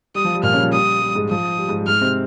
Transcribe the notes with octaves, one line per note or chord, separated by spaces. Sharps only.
G3 D#6
F3
G3
A#2 A#3 F6
C#3 C#4
F3
G3 D#6
G3
G#2 G#3
F3 D#6
G3
G#2 G#3
G3
G#2 G#3 F6
C3 C4